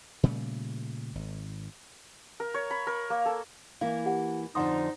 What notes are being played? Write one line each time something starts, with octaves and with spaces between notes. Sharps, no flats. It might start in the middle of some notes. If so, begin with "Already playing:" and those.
A#2 C#3 G3 A3
G#1
A#4
C#5
B5
A#4
A#3
A4
E3 A#3 E4 F5
G4 F#5
F2 D3 F3 D#4 F#5 C6 D#6